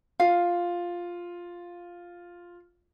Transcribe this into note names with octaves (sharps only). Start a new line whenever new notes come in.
F4 F5